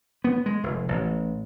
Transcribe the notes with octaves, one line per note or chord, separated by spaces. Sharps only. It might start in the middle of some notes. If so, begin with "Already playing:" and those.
B3
G#3
F1
A1